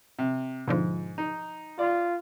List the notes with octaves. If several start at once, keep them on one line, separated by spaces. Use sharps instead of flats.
C3
G#2 B2 D3 F3
D#4
F4 D5